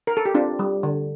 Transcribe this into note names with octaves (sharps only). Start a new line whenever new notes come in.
A#4
A4
G4
C4 D4 F4
G3
D3